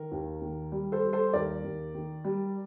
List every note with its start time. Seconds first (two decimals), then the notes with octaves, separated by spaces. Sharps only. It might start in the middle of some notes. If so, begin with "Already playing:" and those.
Already playing: D#3 A#4
0.12 D#2
0.42 D#3
0.72 G3
0.92 A4 C5
1.03 G3
1.13 A4 C5
1.33 D#2 A#4 D5
1.64 D#2
1.95 D#3
2.25 G3